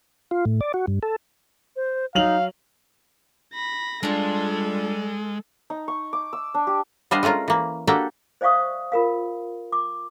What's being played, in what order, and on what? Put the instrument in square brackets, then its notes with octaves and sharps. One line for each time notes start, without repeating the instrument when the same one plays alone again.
[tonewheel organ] F4
A2
D5
F#4
G2
A4
[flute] C5
[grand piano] F#3 F7 F#7 [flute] D#4 [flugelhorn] F5
[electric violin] B5 A#6
[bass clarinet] G3 [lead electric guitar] G#3 [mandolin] D4 F4 [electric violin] A4
[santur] D#4
C#6
D6
E6
D4
G4
[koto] G3 B3 D4 C5 D#5 F5
G#3 A3 C#4 F4 A#4
E3 A#3
A#3 D4 F#4 G4 A4 G5
[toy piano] C5 D5 E5 F5 C#6 D#6
F4 A#4 F5
D6